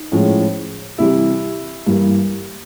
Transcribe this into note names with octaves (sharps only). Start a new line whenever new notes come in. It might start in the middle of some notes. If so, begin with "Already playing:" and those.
Already playing: D#4
A2 F3 G#3 C#4
C3 E3 G3 E4
G2 E3 G3 A#3